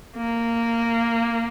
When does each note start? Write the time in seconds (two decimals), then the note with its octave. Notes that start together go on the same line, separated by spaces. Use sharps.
0.17 A#3